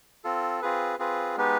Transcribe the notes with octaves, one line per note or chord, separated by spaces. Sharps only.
C4 F4 A4
C4 F4 G#4 B4
C4 F4 G#4 B4
G#3 B3 D#4 G4 B4